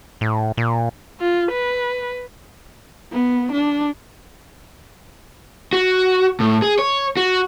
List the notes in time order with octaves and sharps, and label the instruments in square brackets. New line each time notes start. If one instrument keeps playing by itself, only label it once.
[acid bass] A2
A#2
[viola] F4
B4
[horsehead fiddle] B3
D4
[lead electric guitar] F#4
A2
G#4
C#5
F#4